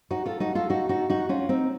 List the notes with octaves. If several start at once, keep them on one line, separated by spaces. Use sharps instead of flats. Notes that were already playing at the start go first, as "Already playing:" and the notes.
D#4 F#4
F4 A4
D#4 F#4
F4 A4
D#4 F#4
D#4 F#4
D#4 F#4
C#4 F4
C4 D#4